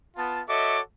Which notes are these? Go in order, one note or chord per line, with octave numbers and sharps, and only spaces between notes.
B3 F4 A5
F#4 A4 C#5 D#5 E5 D6